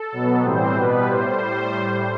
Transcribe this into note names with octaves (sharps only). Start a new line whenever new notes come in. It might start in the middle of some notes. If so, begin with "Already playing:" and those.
Already playing: A4
B2 F#3 B3
A2 E3 G3 C4 C5
B2 G3 B3 B4
A2 G3 C5